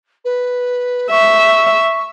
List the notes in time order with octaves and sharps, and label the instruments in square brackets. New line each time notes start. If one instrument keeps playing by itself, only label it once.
[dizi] B4
[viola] E5 [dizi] C#6